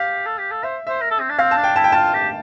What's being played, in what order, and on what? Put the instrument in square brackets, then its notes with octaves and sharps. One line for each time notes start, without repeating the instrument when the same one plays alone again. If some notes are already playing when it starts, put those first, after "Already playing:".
Already playing: [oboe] G4 [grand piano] F5
[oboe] A4
G4
A4
[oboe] C5 [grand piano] E5
[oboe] C5 [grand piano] E5
[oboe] A#4
A4
C4
D4
[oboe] C4 [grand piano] F5
[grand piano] A5
[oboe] D4
[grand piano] G5
[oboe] E4 [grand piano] A5
[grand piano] G5
[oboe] F4 [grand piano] A5
[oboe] G4